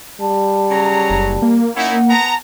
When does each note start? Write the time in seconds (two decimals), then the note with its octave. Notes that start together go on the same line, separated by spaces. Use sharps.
0.21 G3 A5
0.70 C#3 F#3 A#5
1.10 F#1
1.42 A#3
1.76 C#4 D#4 E4 F#5
2.09 B3 A5 A#5